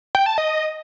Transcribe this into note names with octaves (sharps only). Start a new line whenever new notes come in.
G5
A5
D#5